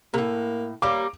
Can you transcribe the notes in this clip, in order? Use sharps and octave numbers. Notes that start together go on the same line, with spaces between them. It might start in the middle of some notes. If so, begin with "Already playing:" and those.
A2 C3 A#3
G3 A#3 C#5 D6